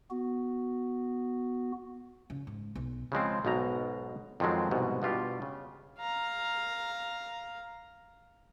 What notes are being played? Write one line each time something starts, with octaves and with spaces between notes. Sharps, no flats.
B3 F#4
C#3
G#2
B1
C#3 F3 G#3 C4
B1 G#2 B2 A#5
F2 D#3 F3 F#3 G#3 C4
C2 G#2 B2
G2 B2 F4 G4
C#3
F5 A#5